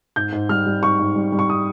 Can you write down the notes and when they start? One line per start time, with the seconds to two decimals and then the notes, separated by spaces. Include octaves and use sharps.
0.16 G#2 G6
0.33 G#2
0.49 G3 F6
0.66 G3
0.83 G#2 C#6
0.99 G#2
1.16 G3
1.32 G3
1.39 C#6
1.49 D#6